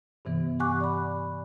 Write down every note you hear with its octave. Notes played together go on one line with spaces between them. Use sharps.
G2 C3 E3 B3
G4 F#5 G#5 C#6 D6 F#6
D5 B5